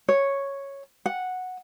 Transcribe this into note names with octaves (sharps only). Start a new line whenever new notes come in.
C#5
F#5